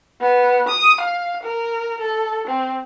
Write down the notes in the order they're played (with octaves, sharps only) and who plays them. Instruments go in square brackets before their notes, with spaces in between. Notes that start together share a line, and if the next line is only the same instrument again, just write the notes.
[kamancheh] B3
D#6
F5
A#4
A4
C4